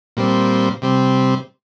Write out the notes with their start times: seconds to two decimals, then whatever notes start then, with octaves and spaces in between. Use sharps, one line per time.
0.17 A#2 G3 C4
0.82 C3 G3 C4